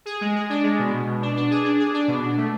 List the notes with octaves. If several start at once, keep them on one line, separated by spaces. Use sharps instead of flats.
G#4
G#3
G#4
D4
G#3
B2
B2
B2
D4
D4
G#4
D4
G#4
D4
B2
D4
A3